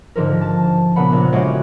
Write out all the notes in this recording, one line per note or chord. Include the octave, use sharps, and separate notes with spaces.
G#2 D3 F3 A#4
A5
A#2 C#3 B3 F#5 B5
A#1
A2 G#3 F#4 G4 C#5 F#5